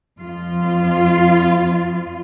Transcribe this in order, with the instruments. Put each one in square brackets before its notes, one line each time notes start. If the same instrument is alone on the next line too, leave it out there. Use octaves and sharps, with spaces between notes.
[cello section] F2 F3 F4